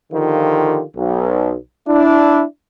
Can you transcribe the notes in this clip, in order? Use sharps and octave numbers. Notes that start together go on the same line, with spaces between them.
D3 D#3 F3 F4 G4
B1
D4 E4